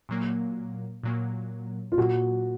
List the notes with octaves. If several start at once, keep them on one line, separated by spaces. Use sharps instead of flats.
A#2 F#3 A#3
A#2 F#3 A#3
F4
A#2 F#3 A#3 F#4